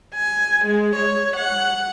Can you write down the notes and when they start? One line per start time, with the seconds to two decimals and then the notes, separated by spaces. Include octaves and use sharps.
0.15 G#5
0.65 G#3
0.96 C#5
1.36 F#5